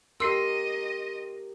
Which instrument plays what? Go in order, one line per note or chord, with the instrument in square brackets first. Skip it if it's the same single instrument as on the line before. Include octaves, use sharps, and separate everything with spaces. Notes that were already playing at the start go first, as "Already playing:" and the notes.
[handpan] G4 A#4 [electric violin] D#5 [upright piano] C6 C7 [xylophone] E6